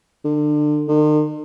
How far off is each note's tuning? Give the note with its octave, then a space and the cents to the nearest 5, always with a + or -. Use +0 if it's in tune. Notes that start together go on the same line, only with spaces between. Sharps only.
D3 +30
D#3 -45